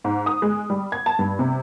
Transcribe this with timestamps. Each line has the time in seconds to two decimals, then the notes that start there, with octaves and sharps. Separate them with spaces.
0.04 G#2
0.26 D#6
0.42 G#3
0.70 G3
0.92 G#6
1.06 A5
1.19 G2
1.39 C3